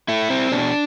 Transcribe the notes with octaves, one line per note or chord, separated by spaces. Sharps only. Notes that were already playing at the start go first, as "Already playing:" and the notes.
A3 E4
C4
B2 D4